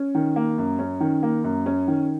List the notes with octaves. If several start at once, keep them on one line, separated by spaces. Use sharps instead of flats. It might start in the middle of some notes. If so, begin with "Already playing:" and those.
Already playing: C#4
D#3
A#3
F#2
C#4
D#3
A#3
F#2
C#4
D#3